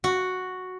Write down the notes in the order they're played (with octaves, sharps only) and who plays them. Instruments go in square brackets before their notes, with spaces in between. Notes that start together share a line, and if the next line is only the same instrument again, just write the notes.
[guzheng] F#4